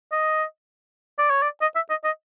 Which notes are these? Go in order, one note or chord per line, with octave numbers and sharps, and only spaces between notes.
D#5
D5
C#5
D5
D#5
E5
D#5
D#5